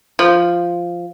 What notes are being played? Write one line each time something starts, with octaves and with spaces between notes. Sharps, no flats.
F3